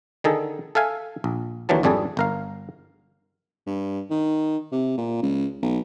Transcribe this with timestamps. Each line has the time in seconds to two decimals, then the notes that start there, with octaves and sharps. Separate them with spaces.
0.24 D3 D#3 G#4 A4
0.75 A4 E5 F5 G#5
1.24 A#1
1.69 D#2 D3 E3 F#3 A5
1.83 G#1 F2 G3 D4 G#4 A4
2.17 G1 A#4 F5
3.66 G2
4.10 D#3
4.72 C3
4.98 A#2
5.22 C#2
5.62 B1